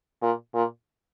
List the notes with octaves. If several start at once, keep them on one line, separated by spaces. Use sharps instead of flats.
A#2
A#2